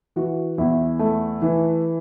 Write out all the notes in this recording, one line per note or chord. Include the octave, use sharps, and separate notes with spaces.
E3 F#4
E2 E4
A3
E3